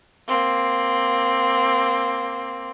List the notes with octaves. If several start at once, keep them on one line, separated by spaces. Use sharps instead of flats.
A#3 C4